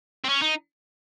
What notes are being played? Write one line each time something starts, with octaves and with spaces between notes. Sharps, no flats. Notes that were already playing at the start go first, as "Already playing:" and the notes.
C4
C#4
D#4